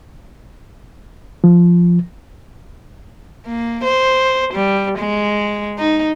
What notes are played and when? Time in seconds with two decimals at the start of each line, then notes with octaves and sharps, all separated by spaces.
1.44 F3
3.47 A#3
3.84 C5
4.54 G3
4.98 G#3
5.78 D#4